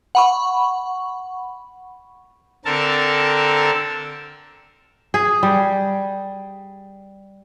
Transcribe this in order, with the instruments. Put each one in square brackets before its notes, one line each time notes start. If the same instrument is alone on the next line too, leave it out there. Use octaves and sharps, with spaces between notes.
[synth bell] F#5 B5 C#6
[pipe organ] D3 C4 A4 A#4 A5
[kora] G#4
G3